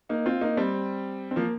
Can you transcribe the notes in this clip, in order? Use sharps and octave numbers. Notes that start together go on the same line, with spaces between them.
A#3 D#4
C4 F4
A#3 D#4
G3 C4
C4
F3 A#3